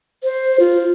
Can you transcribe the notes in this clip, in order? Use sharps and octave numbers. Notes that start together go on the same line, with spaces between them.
C5
F4